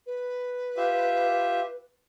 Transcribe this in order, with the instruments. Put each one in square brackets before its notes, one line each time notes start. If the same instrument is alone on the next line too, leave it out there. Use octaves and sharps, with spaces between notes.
[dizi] B4
[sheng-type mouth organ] F4 G4 E5